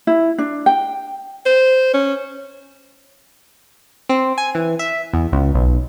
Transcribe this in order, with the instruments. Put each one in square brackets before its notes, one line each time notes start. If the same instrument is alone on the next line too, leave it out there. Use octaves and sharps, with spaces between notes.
[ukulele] E4
D4
G5
[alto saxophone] C5
C#4
[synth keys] C4
G#5
E3
E5
E2
C#2
B1